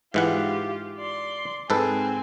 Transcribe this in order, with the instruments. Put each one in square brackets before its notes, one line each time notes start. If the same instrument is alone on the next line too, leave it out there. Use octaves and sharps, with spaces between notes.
[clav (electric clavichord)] G#2 E3 F#5 [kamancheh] F4 G4
[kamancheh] D5 C6
[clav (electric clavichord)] G#2 A4 B4 [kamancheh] C4 G#5